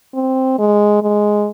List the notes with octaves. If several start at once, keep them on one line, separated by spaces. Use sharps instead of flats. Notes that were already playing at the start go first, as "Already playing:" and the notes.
C4
G#3
G#3